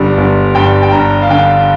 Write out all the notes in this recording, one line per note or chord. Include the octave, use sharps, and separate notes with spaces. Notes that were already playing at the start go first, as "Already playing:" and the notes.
Already playing: G1 D3 G3
G1
G2 G5
G5
G2 A#5
F5
D3 G5